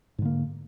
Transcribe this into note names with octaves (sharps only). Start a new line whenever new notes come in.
G#2 D3 A#3